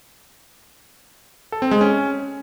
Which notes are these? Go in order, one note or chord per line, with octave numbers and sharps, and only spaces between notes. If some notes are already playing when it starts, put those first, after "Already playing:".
A4
C4
G#3
C#4